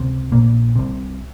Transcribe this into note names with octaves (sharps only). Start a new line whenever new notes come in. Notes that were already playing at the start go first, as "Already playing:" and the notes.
Already playing: C#2 C3
A#1 A#2 A#3
C2 C3